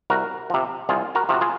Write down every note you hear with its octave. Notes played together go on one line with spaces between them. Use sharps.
C2 F#4 A#4
C3 F3
C2 F4 G#4
F#4 A#4
C3 F3 F#4
F4 G#4